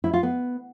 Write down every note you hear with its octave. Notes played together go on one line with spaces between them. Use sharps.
E4
F4
B3